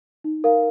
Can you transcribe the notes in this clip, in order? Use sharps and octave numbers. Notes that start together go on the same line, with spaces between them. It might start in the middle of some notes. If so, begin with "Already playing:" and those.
D#4
A#4 F5